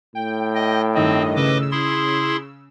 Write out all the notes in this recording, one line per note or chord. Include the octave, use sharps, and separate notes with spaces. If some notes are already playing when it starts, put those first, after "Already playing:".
A2 G5
D#5
G2 D#3 C4 D#5
C#3 B4 D#5 D6 E6
E4 G#4 C6